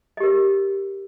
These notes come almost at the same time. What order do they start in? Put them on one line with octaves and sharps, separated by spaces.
D#5 G4 A#4